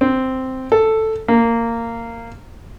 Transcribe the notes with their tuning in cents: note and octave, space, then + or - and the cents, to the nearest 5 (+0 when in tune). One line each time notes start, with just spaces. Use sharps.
C4 -5
A4 +5
A#3 -15